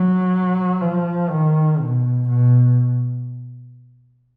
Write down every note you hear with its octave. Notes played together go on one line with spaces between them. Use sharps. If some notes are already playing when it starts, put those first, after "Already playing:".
Already playing: F#3
F3
D#3
B2
B2